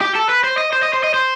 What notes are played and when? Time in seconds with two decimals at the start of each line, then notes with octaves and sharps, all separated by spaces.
0.01 G4
0.16 A4
0.30 B4
0.44 C5
0.58 D#5
0.73 C5
0.83 D#5
0.93 C5
1.04 D#5
1.14 C5